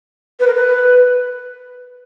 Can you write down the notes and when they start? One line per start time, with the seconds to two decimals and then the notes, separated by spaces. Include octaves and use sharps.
0.40 B4
0.47 A#4
0.54 B4